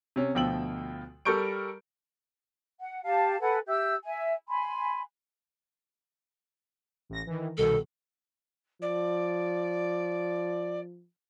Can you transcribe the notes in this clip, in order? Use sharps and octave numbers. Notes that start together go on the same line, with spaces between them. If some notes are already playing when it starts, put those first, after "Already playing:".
C3 C#4
D2 B2 F3 G5 E6 F#7
G3 A4 A#4 C#6 G6 D7
F#5
G4 F5 A5
A4 B4 F#5 G#5
G4 E5 E6 G6
E5 G#5
G#5 B5 C6
A1 A#6
D#3 E3
C2 B2 D#3 A4
F3 D5